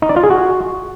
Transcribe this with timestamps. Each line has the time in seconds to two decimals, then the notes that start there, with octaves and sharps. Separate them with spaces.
0.02 D#4
0.09 D5
0.16 F4
0.23 G#4
0.30 F#4